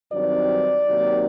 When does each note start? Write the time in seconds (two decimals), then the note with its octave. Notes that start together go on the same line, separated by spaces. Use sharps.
0.12 G2 D#3 F#3 C4 D#4 D5
0.87 C3 D#3 F#3 A#3 D#4